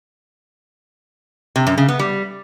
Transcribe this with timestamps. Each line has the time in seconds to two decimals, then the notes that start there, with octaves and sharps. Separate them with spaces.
1.56 C3
1.67 F#2
1.78 C#3
1.88 B3
1.99 G3